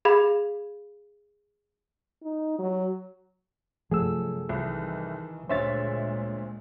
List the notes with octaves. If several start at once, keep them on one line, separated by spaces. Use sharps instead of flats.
G#4 F5 B5 G#6
D#4
F#3
F#2 C3 F3 A3 G#4 A4 E6
C2 D#3 E3
D2 A#2 G#3 C5 C#5 E5 A6